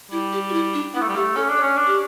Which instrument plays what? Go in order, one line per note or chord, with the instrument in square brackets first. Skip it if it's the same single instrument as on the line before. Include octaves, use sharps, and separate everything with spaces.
[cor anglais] G3 [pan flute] E4
[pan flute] G4
F#4
E4
D4
[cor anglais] B3 [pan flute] E4
[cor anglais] A3
G3
[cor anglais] A3 [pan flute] G4
[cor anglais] C#4 [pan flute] A4
[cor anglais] D4
[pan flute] C#5
[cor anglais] C#4
D4
[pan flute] G4